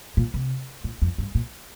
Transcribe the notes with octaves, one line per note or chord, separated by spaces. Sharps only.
A#2
C3
A#2
F2
G2
A#2